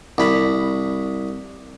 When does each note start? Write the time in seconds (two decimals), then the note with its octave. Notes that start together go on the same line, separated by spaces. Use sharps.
0.18 C2 B5